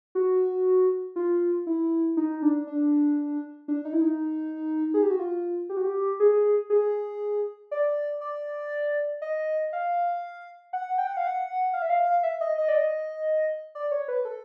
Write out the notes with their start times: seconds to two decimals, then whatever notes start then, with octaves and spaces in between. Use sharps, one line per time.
0.15 F#4
1.16 F4
1.67 E4
2.17 D#4
2.43 D4
2.67 D4
3.68 D4
3.85 D#4
3.93 E4
4.01 D#4
4.94 G#4
5.03 G4
5.10 F#4
5.19 F4
5.69 G4
5.77 F#4
5.84 G4
6.20 G#4
6.70 G#4
7.71 D5
8.21 D5
9.22 D#5
9.73 F5
10.73 F#5
10.98 G5
11.07 F#5
11.17 F5
11.27 F#5
11.73 F5
11.82 E5
11.90 F5
12.23 E5
12.41 D#5
12.58 D#5
12.68 D5
12.75 D#5
13.75 D5
13.91 C#5
14.08 B4
14.25 A4